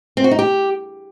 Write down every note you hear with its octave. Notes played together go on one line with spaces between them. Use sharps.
C4
F#4
D#4
G4